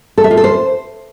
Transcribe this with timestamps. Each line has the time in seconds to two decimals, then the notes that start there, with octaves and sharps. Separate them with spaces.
0.18 A4
0.24 E5
0.31 F4
0.37 A4
0.44 C5